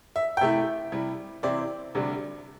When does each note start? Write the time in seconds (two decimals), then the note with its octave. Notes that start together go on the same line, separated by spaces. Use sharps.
0.16 E5
0.37 G5
0.41 C3 A3 E4 E5
0.92 C3 G3 E4
1.43 C3 E3 C4 E4 D5
1.95 D2 C3 G3 D4